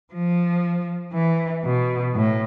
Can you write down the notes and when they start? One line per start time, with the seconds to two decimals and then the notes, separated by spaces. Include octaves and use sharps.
0.13 F3
1.14 E3
1.65 B2
2.15 A2